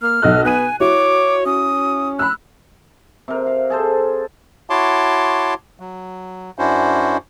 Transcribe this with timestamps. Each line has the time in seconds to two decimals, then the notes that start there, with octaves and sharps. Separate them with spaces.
0.02 A#3 F6
0.22 B1 A4 D#5 F#6
0.45 B3 G#5 F#6 D#7
0.80 E4 F#4 C#5 D6
1.46 C#4 D#6
2.19 B5 E6 F#6
3.28 C3 A#4
3.47 F5
3.70 G#4 A4 C5
4.70 E4 F#4 C#5 A5 C6 D6
5.80 F#3
6.59 F#2 C#4 D4 E4 F#4 C5